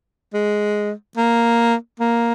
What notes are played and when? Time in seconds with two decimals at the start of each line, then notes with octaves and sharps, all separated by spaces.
0.33 G#3
1.17 A#3
2.00 A#3